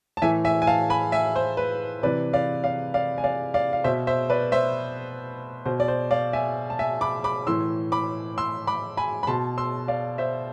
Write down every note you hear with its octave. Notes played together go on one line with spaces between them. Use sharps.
A5
A2 E3 E5 G#5
E5 G#5
G#5
F5 A5
G#5 B5
E5 G#5
C5
B4
C3 E3 B4 D5
D5 F5
D5 F5
D5 F5
G#5
D5 F5
D5 F5
F5
B2 C5 E5
C5 E5
B4 D5
C5 E5
B2 C5
D5
C5
D5 F5
E5 G#5
A5
E5 G#5
B5 D6
B5 D6
A2 E3 C6 E6
B5 D6
C6 E6
B5 D6
G#5 B5
B5
B2 A5 C6
C6 E6
D5 F5
C5 E5